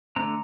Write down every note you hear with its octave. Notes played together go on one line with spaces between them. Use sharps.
D3 A3 C4 A#5